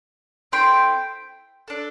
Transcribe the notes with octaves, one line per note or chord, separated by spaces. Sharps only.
C4 E4 A4 G5 C6
D4 A4